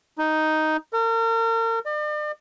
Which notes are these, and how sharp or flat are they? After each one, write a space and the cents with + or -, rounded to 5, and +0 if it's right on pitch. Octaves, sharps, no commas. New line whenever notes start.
D#4 +0
A#4 -40
D5 +40